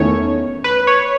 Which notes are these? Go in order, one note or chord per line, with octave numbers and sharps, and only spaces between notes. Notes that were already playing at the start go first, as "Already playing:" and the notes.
Already playing: E2 D#3 A3 C#4 C#5
B4
C#5